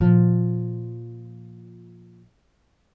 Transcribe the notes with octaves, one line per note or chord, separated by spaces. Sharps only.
A#2 F3